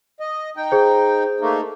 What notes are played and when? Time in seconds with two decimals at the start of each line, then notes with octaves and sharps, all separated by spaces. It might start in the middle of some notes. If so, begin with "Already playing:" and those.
0.20 D#5
0.57 D#4 G5
0.72 G#4 C5
1.40 A3 A#3 D#4